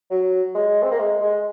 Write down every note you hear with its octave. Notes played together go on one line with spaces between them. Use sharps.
F#3
G#3
C4
A#3
G#3
G#3